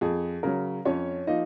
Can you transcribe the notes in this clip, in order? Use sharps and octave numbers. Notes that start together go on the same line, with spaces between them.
F2 G#4
C#3 F#3 A#4
F2 C#4 C#5
F3 A#3 D#4 D#5